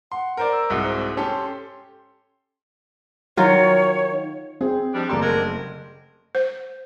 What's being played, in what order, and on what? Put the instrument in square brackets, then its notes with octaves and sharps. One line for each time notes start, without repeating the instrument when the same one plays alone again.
[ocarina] F#5 [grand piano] C6
[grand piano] A#4 C5 D5
[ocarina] E6
[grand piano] C2 G#2 F#4
[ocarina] C5
[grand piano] C#4 G4 A4 [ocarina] C6
[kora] D#3 F#3 F4 [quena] C#5
[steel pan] C4 [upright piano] G#4
[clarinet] F3 [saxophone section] G3 G#3 D4
[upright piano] F#1 A3 C6 [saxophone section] A#3 D4 G4 [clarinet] A4
[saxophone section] D3 G3 G#3 [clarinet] A#4
[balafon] C5